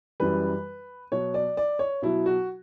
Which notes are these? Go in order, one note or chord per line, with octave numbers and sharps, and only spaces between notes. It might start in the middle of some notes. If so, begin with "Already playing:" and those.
F#2 E3 G3 B4
B2 F#3 C#5
D5
D5
C#5
B2 F#3 E4
F#4